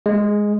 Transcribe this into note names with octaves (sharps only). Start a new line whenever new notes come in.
G#3